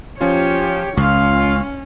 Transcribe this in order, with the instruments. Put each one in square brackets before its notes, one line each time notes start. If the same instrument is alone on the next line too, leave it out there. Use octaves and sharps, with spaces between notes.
[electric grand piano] F3 C#4 F4 [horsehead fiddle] G4 C#5
[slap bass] C#2 [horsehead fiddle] C#4 [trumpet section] F4 F5 [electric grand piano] C#6